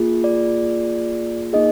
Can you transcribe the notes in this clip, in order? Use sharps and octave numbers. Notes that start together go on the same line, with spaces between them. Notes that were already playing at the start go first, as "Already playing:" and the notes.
Already playing: A#3 F4 G#4
D5
A#3 D#4 G#4 D#5